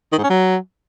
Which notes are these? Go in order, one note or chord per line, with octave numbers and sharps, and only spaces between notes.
D#3
G#2
C#4
F#3